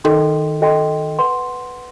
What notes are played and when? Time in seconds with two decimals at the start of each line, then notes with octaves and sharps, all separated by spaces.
0.04 D#3 F#4 A4 D#5 G5 C6
0.61 F#4 A4 D#5 G5 C6
1.19 B4 F#5 C6